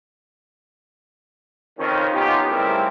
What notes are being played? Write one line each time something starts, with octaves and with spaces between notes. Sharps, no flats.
F2 D#3 C#4
B3 C#4 D#4 F4 G4
C#3 G3 A3 C4 E4 A#4